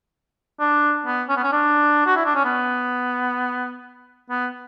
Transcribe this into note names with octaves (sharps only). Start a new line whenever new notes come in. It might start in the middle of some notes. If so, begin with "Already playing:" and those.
D4
B3
C#4
B3
C#4
D4
F#4
E4
D4
C#4
B3
B3